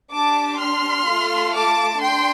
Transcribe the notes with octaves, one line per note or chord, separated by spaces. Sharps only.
D4 G4 A5 D6
C6 F6
A3 F4 A4
A5 D6
D4 G5 C6